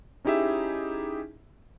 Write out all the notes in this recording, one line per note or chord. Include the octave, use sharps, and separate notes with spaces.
C#4 D#4 E4 G4 G#4 E5